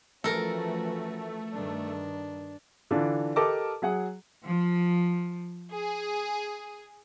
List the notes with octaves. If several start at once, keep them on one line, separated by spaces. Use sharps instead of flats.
E3 F3 A3 C#4 F#4 A4 A#4
G2 D#3 D4
D3 E3 D4 F4
G4 A4 A#4 D#5 A5 D6
F#3 G#4 F#5
F3
G#4